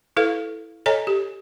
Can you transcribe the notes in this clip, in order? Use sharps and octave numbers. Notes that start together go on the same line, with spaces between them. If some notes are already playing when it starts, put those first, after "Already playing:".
E4 A4 B4 F5
A4 C#5 D#5 G#5 A#5
G4